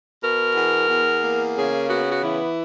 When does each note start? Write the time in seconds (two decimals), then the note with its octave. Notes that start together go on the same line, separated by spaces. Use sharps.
0.23 B2 A#4
0.56 E2
0.89 E2
1.22 A#3
1.55 C#3 G#4
1.89 B3 F#4
2.10 F#4
2.21 E3 E4